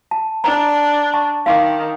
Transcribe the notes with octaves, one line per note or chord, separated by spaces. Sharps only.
A5
D4 A#5
A5 C#6
D#3 F5 C6 D6